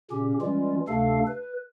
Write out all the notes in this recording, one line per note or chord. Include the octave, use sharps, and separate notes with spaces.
A#2 C#3 C#4 G4
E3 G3 G#3 C#4 F4
D2 C3 A3 D4 A4 F5
B4